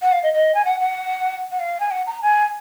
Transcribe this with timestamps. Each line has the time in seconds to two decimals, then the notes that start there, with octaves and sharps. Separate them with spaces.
0.02 F#5
0.12 F5
0.23 D#5
0.33 D#5
0.55 G#5
0.65 F#5
0.80 F#5
1.51 F#5
1.60 F5
1.80 G#5
1.91 F#5
2.07 A#5
2.22 G#5